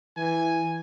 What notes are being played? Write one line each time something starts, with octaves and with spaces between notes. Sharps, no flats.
E3 G#5